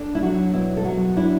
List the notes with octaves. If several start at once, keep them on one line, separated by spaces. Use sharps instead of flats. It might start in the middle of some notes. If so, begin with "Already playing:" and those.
Already playing: D4 A4
E4
F#3 F#4
B2 E4
A4
F#3 F#4
D4 E4